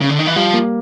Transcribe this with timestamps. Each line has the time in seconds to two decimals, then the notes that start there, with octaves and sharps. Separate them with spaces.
0.01 C#3
0.10 D3
0.19 D#3
0.27 E3
0.36 F3 G3
0.54 A#3